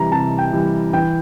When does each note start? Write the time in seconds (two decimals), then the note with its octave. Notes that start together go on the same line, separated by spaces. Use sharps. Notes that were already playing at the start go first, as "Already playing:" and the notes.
Already playing: C3 E3 G3 A#5
0.11 C3 A5
0.38 G5
0.53 E3 G3
0.93 E3 G5